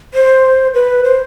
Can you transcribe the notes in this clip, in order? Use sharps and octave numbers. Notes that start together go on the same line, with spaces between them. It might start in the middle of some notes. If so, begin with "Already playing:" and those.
C5
B4
C5